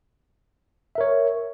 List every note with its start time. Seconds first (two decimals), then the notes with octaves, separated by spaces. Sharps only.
0.95 E5
0.98 A#4
1.01 C#5